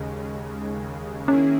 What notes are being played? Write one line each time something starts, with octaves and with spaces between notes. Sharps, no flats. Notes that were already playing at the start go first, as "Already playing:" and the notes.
Already playing: D#2 C#3 G#3
D#3 A#3 C#4 E4 G#4